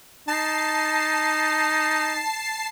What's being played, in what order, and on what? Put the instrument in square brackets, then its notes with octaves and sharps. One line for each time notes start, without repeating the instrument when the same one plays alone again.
[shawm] D#4 [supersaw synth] A5 C7